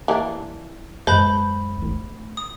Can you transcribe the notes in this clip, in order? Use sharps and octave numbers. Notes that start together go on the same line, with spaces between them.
E3 A#3 D4
F#2 G#3 B4 C5 D#5 A5 B5 G6
A3 D4
D#6